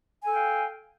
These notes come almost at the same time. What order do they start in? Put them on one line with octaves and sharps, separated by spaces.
G#5 A4 G5 F5